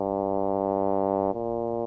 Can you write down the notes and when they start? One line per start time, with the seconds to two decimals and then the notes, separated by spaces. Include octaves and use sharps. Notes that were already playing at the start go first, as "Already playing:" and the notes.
Already playing: G2
1.34 A#2